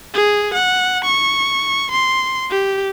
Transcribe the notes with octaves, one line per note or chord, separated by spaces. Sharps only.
G#4
F#5
C#6
C6
G4